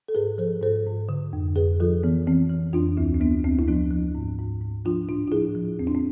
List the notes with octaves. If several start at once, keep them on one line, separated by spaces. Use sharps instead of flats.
A4
G#2 G#4 B4
F3 A4 C5
G#2 A4 C5
G#2
D3
F2
F2 G#4 B4
F3 F4 A4
E3 B3
E3 C4
E3
F2 D4 F4
D2 C4 E4
C4
D2 B3 D4
D2 C4
E4
F3 B3 D4
F3
G#2
G#2
G#2
F3 D4 F4
A2 D4 F4
F4
F3 E4 G#4
F3
E2 C4
D4
C4